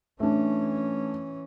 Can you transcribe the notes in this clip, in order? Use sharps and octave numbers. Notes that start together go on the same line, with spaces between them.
E3 A3 C#4 D4